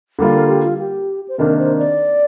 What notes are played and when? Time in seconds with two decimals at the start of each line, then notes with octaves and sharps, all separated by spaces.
0.19 D3 G3 A#3 F4
0.34 A#4
0.49 G4
0.64 F4
0.79 G4
1.28 C5
1.38 C3 D#3 A#3 D4 A#4
1.59 C5
1.79 D5